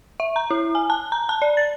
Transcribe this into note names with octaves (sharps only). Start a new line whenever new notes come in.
E5
A#5
E4
G#5
A5
A#5
A5
D5
A6